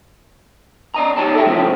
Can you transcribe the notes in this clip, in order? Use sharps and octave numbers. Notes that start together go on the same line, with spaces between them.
D5 D#5 A#5
D#4 G4 C#5 A5
A4 E5 G5
F2 A2 C#3 F3 C4